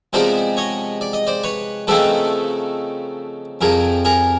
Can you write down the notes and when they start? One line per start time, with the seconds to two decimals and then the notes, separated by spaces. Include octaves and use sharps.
0.13 C3 F3 G#3 B3 D#4 C5 D5
0.57 C#5 D#5
1.01 D5
1.13 D#5
1.27 C5 D5
1.44 B4 C#5
1.87 C#3 F3 A3 C4 D#4 A4 B4
3.61 F2 C3 F3 G#4 A#4
4.05 G#4 A#4